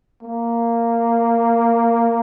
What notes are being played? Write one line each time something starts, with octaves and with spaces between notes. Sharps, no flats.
A#3